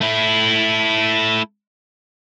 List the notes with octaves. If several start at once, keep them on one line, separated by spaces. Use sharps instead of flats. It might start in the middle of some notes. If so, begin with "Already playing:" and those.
A3 E4